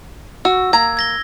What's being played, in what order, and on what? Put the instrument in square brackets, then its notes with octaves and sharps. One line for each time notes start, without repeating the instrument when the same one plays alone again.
[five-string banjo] F#4 [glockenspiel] E6
[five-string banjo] A#3 A#5 [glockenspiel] G#6
[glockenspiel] G#6 A#6 G7